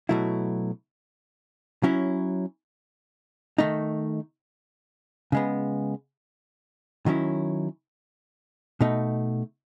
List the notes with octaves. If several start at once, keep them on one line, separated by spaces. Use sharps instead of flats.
B2 F#3 A3 E4
F#3 C#4 E4
D#3 A3 D#4
C#3 G#3 B3
D#3 F#3 C#4 E4
B2 A3 D#4